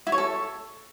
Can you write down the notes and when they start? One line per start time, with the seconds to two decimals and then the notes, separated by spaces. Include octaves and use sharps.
0.07 E4
0.12 C#5
0.18 A4